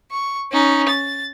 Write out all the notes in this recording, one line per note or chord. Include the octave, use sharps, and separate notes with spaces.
C#6
C#4 D#4
A6